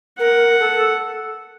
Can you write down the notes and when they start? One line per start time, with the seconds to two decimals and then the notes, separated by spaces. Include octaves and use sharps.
0.19 A#4 F#5
0.60 A4